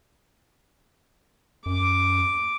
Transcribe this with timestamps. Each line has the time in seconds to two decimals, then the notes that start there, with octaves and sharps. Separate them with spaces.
1.66 F#2 D6